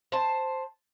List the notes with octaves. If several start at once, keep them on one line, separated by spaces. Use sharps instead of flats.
C5 A5